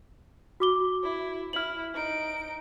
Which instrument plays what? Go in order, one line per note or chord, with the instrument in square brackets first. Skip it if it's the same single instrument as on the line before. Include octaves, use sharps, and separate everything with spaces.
[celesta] F#4 D6 G7
[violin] E4
[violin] E4 [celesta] F6 F#7
[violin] D#4 D7